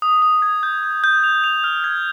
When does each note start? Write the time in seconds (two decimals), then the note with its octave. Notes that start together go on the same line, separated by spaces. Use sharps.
0.02 D#6
0.22 D#6
0.42 G#6
0.63 G6
0.83 G6
1.04 G6
1.24 F7
1.44 F7
1.64 F6
1.84 G#6